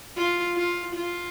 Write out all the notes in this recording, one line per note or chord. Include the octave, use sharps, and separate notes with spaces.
F4
F4
F4